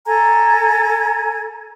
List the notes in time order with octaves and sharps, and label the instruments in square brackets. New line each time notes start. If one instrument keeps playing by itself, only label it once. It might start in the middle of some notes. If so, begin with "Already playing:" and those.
[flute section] A4 G#5 A#5 G#6